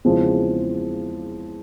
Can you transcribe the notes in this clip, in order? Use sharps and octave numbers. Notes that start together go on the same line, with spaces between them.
E2 C#3 F3 G#3 C4